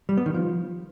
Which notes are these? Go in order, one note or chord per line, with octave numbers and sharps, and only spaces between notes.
G3
B3
D#3
F3